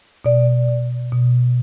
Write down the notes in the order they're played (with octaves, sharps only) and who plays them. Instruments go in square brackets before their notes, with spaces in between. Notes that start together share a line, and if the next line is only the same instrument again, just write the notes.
[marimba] B2 D5
B2
B2